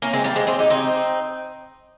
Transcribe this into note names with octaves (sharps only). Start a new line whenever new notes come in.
A#3 C#4
G#3 C4
G3 A#3
G#3 C4
G#3 C4
D#4 G4
C4 D#4